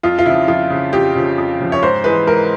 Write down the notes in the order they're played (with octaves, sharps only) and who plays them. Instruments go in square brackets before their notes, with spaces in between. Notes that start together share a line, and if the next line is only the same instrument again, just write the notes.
[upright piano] F2 F4
F4
C#3 F3 E4
F2 F4
C#3 F3
F2 G4
C#3 F3
F2
C#3 F3
C#5
G#2 C5
E3 G#3 B4
G#2 A#4